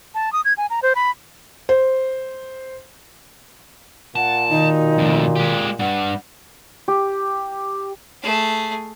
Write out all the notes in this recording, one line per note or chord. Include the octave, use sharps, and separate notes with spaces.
A5
D#6
G#6
G#5
A#5
C5
B5
C5
A#2 F#5 A5
B2 D#3 D#4
F2 A2
G#3 G4
G2 F#5
G4
A3 G#4